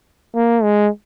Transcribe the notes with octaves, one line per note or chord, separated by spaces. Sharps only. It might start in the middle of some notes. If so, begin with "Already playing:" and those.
A#3
G#3